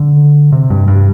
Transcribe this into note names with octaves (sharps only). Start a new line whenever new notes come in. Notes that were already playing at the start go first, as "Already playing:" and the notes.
Already playing: D3
C3
G2
G2